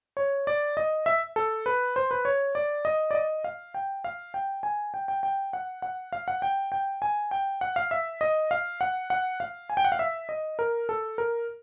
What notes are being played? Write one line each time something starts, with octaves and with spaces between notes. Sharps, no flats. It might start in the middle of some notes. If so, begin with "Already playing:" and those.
C#5
D5
D#5
E5
A4
B4
C5
B4
C#5
D5
D#5
D5
D#5
F5
G5
F5
G5
G#5
G5
G5
G5
F#5
F#5
F5
F#5
G5
G5
G#5
G5
F#5
F5
E5
D#5
F5
F#5
F#5
F5
G#5
G5
F#5
F5
E5
D#5
A#4
A4
A#4